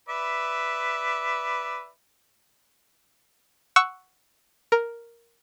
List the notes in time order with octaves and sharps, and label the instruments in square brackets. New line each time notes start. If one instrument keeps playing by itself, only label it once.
[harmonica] B4 D5 E5
[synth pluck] F#5 C#6 E6 F#6
A#4